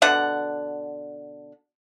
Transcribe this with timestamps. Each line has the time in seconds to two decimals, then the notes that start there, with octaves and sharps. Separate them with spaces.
0.02 B2 D3 F#5